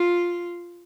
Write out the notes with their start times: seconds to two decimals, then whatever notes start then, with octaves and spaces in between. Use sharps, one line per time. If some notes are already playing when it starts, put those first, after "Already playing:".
Already playing: F4